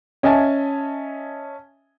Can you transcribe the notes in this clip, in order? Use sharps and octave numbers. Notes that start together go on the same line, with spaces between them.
C#4 D#5 E5 G#5 A5